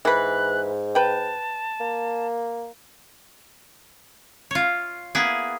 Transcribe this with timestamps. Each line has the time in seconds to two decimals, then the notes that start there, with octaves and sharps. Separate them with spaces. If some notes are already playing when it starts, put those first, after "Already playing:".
0.05 G#2 E3 B4 F#6
0.95 B4 G5 A5
1.80 A#3
4.51 F4 C#5
5.15 A#3 B3 E4 G#4